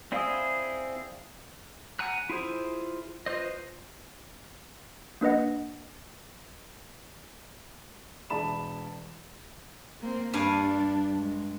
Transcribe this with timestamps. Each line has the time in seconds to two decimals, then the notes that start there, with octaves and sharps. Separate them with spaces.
0.12 C4 E4 G#4 D5 F5 D#6
1.99 F#5 G#5 A#5 F#6
2.30 E4 F4 G#4 C5
3.26 F4 B4 C5 D#5
5.21 A#3 D4 B4 D#5 F#5
8.30 E1 D5 A5 B5 E7
10.00 A#3 C4
10.33 G2 G3 D4 F5 G#5
11.18 G#3